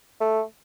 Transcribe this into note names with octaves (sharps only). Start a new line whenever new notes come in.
A3